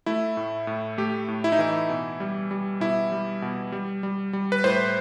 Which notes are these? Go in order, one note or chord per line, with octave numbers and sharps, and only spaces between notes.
A3 E4
A2
A2
A3 G4
A2
E4
D#4
E3 E4
B2
G3
G3
B2 E4
G3
B2
G3
G3
G3
B4
A2 C5